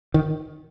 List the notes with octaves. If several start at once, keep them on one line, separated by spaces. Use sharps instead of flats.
D#3